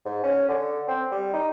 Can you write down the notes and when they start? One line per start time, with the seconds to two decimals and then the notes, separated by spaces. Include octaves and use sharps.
0.05 G#2
0.23 C#4
0.48 D3
0.88 C4
1.11 G3
1.33 D#4